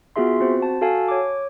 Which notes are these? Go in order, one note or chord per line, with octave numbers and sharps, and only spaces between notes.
B3 F4 F#4 G#4 E5 C6
C4 F#4 C5
A5
F#4 A4 F5 G#5 A5
C#5 D6